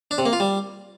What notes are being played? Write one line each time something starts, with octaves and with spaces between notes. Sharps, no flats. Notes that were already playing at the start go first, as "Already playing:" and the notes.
D4
C3
A#3
F4
G3